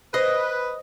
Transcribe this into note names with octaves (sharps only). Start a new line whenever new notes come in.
B4 C5 D#5